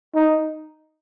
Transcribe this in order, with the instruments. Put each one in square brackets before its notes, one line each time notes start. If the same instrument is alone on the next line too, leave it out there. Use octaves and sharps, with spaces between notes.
[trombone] D#4